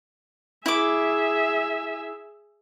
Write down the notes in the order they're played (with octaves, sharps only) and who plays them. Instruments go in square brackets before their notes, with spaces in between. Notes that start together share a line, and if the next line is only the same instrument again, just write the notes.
[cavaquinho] E4 D6 [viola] G#4 E5